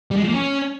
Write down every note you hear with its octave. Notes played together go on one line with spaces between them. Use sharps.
G3
G#3
F3
A#3
C#4